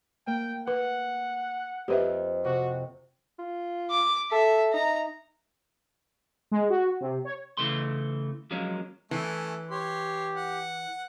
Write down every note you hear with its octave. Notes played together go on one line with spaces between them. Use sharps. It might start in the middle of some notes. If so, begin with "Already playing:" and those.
A#3 G5
B4 F#5
F2 G4 B4 D#5 E5
C3 F#4
F4
D6
A4 E5
D#4 A#5
G#3
F#4
C3
C#5
C#3 E3 A3 C6
F3 F#3 G#3 A#3 C#4
E3 A3 C#4
G4 C#5 C6
F#5